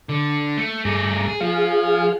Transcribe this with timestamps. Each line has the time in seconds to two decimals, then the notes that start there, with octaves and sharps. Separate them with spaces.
0.09 D3
0.57 A3
0.85 G2 A3 G#4 A#5 D6
1.26 G#4
1.40 F3 G#4 F5